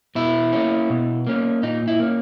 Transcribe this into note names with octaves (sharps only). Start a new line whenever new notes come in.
B2 E4
A#3 C#4
B2
A#3 C#4
A#2 D#4
E4
A#3 C#4